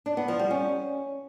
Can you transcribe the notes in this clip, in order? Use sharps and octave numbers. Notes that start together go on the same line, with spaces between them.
D4
B3
F3
G3
C#4